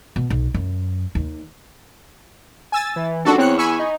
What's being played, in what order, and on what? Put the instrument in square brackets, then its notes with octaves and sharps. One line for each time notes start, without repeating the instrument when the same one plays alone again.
[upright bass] B2
B1
F#2
D#2
[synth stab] G#5 E6 A6
[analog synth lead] E3
[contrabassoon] D#1 [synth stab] D4 F#4 A4
[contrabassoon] E2 [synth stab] C4 F#6 C#7 [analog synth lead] C#5
[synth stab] G#5 B5 C#6 [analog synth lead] E6
[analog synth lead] D#4